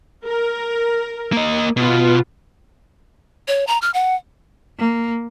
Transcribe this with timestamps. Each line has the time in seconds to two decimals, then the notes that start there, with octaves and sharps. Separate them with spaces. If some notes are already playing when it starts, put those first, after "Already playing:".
0.26 A#4
1.33 A#3 D#5
1.77 B2 B3 F4
3.48 C#5
3.67 A#5
3.82 F6
3.94 F#5
4.78 A#3